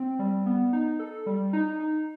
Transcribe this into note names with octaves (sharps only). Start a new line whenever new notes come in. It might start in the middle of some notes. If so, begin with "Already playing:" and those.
Already playing: C4
G3
B3
D#4
A4
G3
D#4
D#4